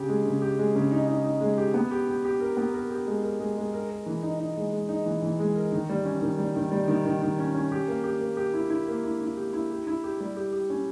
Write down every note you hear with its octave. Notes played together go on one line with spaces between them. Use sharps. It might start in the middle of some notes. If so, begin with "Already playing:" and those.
Already playing: C#3 G4
G#3
C#3
G4
G#3
C#3
D#4
D#4
D#4
G#3
G4
B3
G4
G4
G4
A#4
B3
A#4
G4
G#3
A#4
G#3
G#3
A#4
A#4
E3
D#4
D#4
G#3
G#3
D#4
E3
E3
G#3
A#4
D#3
G3
C#4
D#3
G3
D#3
G3
D#3
D#3
D#3
C#4
C#4
G4
A#3
G4
A#3
G4
E4
E4
A#3
E4
E4
G4
E4
G4
E4
G4
G3
G4
G4
C#4